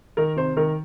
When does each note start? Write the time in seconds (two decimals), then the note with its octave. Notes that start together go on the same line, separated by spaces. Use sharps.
0.17 D#3 A#4
0.36 C3 C5
0.57 D#3 A#4